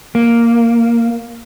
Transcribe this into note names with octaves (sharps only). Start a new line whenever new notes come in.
A#3